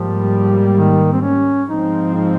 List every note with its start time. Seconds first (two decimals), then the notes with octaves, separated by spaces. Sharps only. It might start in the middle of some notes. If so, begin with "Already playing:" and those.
Already playing: G#2 F3 G3 A#3
0.75 D#3
1.13 C4
1.22 C#4
1.68 G#2 F3 C4 D#4
2.15 D#4